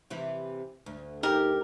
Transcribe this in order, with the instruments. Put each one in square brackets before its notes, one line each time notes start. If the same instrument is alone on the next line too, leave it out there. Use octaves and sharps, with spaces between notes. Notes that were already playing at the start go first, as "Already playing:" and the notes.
[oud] C3 E3 E4
D2
[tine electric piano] D#4 [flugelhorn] G4 [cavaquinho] A#4